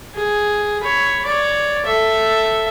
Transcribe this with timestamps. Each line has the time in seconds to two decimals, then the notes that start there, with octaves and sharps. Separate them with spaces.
0.15 G#4
0.82 C#5 B5
1.26 C#5 D5
1.85 A4 E5